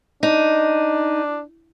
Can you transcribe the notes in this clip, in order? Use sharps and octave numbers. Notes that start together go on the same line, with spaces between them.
D4 D#4